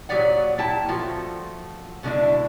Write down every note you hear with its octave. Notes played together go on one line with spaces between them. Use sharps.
A#2 F#3 G4 G#4 D5 F#5
A#2 E4 G5 A5
F3 A3 F4 F#4
B2 D3 G#3 D4 E4